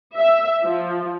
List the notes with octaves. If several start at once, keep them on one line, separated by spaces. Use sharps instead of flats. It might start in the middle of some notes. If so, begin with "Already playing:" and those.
E5
F3